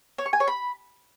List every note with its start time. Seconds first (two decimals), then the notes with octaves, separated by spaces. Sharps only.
0.18 C#5
0.26 C#6
0.33 G#5
0.40 C#5
0.47 B5